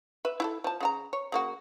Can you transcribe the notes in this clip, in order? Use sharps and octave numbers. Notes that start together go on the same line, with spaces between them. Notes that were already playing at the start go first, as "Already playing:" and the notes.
B4 E5
E4 F#4 A4
F3 A5
C#3 F#4 A#5
C#5
C#3 A#3 F#4